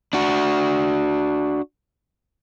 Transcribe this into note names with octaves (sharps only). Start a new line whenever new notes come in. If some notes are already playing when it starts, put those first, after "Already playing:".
D4 F#4